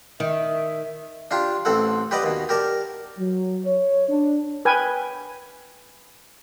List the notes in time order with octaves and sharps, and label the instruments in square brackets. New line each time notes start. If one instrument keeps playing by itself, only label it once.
[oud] D#3 [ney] E5
[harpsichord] D4 F4 G4
A1 C4 A4 F#5
G4 B4 D5 D#5 F#5 D6
D#2 B2
G4 A#4 D5 A5
[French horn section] F#3
C#5
D4
[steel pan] B4 G5 G#5